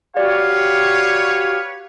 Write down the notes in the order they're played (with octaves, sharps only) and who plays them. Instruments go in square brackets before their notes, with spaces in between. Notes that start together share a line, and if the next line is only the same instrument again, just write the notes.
[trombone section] F#4 G4 [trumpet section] B4 C#5 [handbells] D5 [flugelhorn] F5